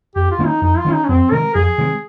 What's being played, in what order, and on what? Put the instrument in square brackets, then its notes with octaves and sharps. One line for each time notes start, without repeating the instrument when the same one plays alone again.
[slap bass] F2 [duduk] G4
[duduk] F4
[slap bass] D#3 A#3 C#4
[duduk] D#4
[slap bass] F2 [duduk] D#4
[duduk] F4
[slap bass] D#3 A#3 C#4
[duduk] D#4
C#4
[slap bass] F2 [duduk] C4
[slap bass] C3 D#3 G#3 [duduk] A#4
[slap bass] F2 [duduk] G#4
[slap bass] C3 D#3 G#3